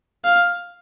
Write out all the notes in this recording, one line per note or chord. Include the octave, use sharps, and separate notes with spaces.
F5